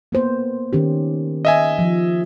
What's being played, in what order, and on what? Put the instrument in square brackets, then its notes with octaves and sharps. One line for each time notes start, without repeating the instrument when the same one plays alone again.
[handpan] A#3 B3 C5
D#3 C#4 G4
[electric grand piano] D#5 E5 G#5
[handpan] F3